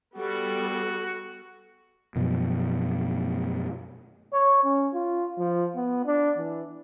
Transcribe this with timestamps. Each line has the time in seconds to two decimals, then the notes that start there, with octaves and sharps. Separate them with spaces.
0.15 G3 B3 F#4 A4
2.16 F#2 B2 F3
4.33 C#5
4.64 C#4
4.94 F4
5.38 F3
5.76 B3
6.06 D4
6.37 E3